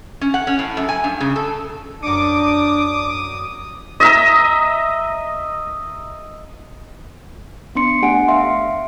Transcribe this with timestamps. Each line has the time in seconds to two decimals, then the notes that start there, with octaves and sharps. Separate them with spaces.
0.21 C#4
0.34 F#5
0.47 C#4
0.59 A2
0.77 F#2
0.89 G#5
1.04 G2
1.20 C#3
1.36 A4
2.02 F#2 D4 D6 D#6 C#7
4.00 D#5 E5 A#5
7.75 B3 D4 C6 C#7
8.02 A3 D4 G4 F#5 G#5 D7
8.28 E5 F5 C6